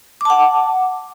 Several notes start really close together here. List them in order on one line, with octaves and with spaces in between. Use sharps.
D6 A5 F#5